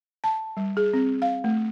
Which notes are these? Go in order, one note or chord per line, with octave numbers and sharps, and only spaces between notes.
A5
G3
G#4
C4
F5
A3